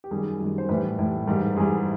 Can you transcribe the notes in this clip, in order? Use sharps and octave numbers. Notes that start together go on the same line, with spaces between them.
G4
F#2 D#3 G3 G#4
F#2 D#3 G3
C5
A2 E3 G3 B4
A2 E3 G3
G#2 E3 G3 A#4
G#2 E3 G3 G#4